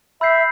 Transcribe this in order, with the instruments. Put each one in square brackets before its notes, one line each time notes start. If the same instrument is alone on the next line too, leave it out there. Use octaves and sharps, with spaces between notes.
[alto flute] E5 [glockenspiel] B5 E6 G6 C7